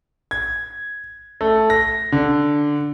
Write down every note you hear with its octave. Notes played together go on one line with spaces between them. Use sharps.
G#6
A3
A#6
D3